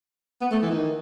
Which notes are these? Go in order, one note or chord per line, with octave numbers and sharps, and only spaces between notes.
B3
A3
E3
D#3